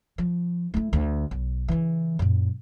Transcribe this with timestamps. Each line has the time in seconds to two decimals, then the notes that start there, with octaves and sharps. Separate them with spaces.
0.18 F3
0.74 A3 E4
0.93 D2
1.31 B1
1.68 C#3 E3
2.19 F#2 A#2